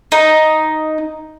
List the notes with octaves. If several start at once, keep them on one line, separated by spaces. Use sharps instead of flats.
D#4